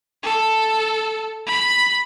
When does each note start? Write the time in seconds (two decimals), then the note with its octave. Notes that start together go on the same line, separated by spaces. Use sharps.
0.23 A4
1.47 B5